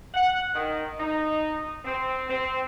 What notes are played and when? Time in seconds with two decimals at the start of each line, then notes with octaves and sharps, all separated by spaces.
0.14 F#5
0.54 D#3
1.00 D#4
1.84 C4
2.29 C4